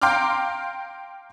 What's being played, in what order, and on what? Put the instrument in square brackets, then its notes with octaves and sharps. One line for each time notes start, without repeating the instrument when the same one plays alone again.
[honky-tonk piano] F5 G5 A#5 C6 D6 F6